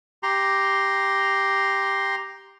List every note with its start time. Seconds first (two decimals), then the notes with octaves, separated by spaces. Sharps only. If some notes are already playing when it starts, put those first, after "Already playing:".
0.23 G4 A#5 C6